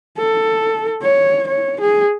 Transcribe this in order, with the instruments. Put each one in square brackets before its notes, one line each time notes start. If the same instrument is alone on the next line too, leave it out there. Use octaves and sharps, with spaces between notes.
[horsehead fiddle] A4
C#5
C#5
G#4